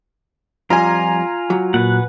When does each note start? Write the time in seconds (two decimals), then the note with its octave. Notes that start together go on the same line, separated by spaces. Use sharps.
0.70 F2 F3 G3 F4 G#5 A#5
1.50 F#3
1.74 A#2 B4 F#5